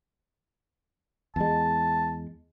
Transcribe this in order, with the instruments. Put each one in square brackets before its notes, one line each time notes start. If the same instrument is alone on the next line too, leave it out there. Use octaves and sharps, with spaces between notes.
[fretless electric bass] E2 G#3 [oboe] A5